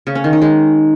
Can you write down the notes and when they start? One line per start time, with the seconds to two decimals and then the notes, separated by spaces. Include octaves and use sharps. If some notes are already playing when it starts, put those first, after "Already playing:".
0.07 C#3
0.15 C#4
0.24 D#3
0.33 D#4
0.42 G#3